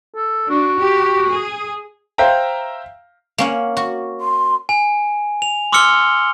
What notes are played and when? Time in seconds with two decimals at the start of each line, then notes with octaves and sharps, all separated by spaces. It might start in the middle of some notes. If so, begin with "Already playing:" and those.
0.16 A4
0.50 D4 F#4
0.79 G4
1.29 G#4
2.18 C5 E5 F5 G5 A#5
3.38 A#3 C#4 F#5
3.77 F#4
4.21 C6
4.69 G#5
5.42 F7
5.72 C6 D6 E6 F6 C#7 G7